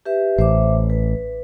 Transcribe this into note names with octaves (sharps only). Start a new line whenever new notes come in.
G4 B4 E5
A1 C5 E5 D6
B4